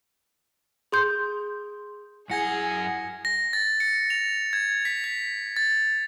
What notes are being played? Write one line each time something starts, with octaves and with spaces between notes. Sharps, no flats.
G#4 C6 G6
F#2 E4 G#4 F#5 G#5 G#6 A#6 C#7
A#6
A6
C#7
F7
G#6
B6
B6
A6